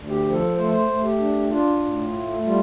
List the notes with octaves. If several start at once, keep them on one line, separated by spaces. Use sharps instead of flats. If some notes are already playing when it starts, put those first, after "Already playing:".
Already playing: D2
G4
F3
A4
A3 C5
A4
C5
A3
G4
D4
D4 F4
A2
A3
G3 F4